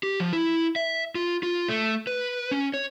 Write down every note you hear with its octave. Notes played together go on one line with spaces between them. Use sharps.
G4
F3
E4
E5
F4
F4
A3
B4
C#4
C#5